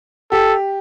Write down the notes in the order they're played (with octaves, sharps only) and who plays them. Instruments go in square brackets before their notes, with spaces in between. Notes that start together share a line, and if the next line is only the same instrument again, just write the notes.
[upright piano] G4 [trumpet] A4